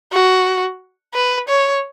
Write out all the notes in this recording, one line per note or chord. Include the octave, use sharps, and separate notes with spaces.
F#4
B4
C#5